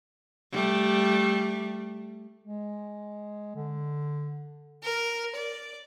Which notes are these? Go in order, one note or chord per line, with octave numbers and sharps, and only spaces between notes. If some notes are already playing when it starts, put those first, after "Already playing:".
G3 A3
G#3
D3
A#4
D5